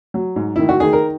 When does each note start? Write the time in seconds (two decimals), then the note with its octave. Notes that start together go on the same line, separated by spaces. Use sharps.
0.14 F#3
0.36 G#2
0.56 D#3 E4
0.69 F#4
0.80 D#3 G#4
0.93 A#4